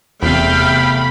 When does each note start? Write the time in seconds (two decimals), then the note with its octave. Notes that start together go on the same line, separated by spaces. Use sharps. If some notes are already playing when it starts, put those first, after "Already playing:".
0.23 E1 E2 C3 A3 F5 G5 B5